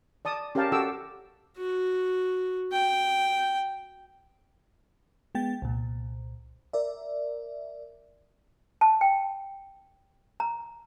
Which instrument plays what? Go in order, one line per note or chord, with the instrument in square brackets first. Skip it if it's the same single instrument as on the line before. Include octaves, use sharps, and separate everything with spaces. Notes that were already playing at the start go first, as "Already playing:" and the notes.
[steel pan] D5 A5 D#6
C#4 G4 A#4 F5 G5 A5
F#4 G4 A4 D6 E6
[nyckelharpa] F#4
G5
[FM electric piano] G#3 B3 G5 A6
C2 A#2
A#4 D5 E5
[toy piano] A5
G5
A#5